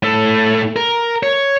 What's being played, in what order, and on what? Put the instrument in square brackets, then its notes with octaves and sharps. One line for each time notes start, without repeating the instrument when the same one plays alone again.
[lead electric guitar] A2 A4
A#4
C#5